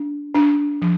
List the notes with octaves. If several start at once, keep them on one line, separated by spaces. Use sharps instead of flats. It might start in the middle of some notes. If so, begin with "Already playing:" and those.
Already playing: D4
D4
F3